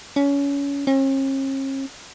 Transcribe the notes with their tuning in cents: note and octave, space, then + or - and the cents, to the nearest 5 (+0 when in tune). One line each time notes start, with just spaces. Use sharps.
C#4 +25
C#4 -45